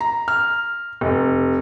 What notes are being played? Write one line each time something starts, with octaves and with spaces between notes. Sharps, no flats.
A#5
F6
F1